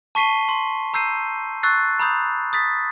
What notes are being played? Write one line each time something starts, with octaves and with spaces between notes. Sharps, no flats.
A5 C#6 B6 C7 D#7 G7
C6
A#5 E6 G6 C7 D#7
C#6 E6 F#6 A6 C7
A#5 B5 D#6 G6
D#6 A6 B6